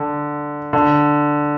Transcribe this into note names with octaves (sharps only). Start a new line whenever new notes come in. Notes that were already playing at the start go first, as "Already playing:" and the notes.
Already playing: D3
D3